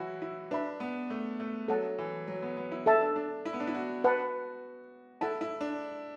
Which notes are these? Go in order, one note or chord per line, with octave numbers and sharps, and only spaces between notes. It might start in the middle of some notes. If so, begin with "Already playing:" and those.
Already playing: E3 F#3 E4 F#4
E4
D4 B4 E5 B5
B3
A3
A3
F#3 A4 F#5 A5
E3
F#3
B3
B3
E4
A4 E5 A5
D4
D4
E4
B3
D4
E4
F#4
B4 F#5 A5
E4 A4 F#5 A5
E4
D4